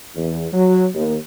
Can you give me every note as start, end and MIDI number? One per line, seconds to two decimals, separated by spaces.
0.15 0.46 40
0.53 0.88 54
0.94 1.15 39